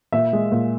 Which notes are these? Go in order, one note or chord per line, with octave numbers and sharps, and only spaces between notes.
A#2 E5
G#3
A#2